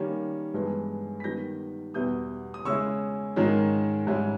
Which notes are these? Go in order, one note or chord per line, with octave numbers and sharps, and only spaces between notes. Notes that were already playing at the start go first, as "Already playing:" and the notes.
Already playing: D#3 G3 A#3 C#4
G2 E3 G#3 B3
B6
D#3 G3 B3 G6 A#6
E2 B2 G3 B3 E4 D#6 G6
D#6
C#3 G#3 C#4 E4 C#6 E6
G#2 D#3 G#3 C#4
G#2 G3 C#4 E4